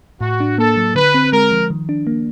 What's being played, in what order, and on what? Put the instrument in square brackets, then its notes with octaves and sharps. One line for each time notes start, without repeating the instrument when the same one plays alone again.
[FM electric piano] A2 [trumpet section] F#4
[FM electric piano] D4
[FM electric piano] A#3 [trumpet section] A4
[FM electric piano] F#3
[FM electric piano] D3 [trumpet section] B4
[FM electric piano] C4
[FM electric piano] G#3 [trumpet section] A#4
[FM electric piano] F3
D#3
D4
A#3